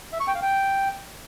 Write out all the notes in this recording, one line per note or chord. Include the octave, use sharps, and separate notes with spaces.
E5
C#6
G5
F5
G5